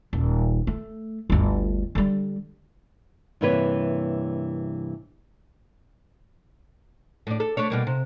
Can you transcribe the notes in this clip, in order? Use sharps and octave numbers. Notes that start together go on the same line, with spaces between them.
D#1
A3
G1 D2
D3 G3
G2 C3 E3 A#3 B4 C#5
A2 D4
A4
A3 D4 C#5
B2 G3 A#3
C3